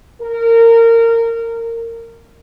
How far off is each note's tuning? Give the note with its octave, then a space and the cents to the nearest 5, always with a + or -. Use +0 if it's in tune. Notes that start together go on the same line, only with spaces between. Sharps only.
A#4 -20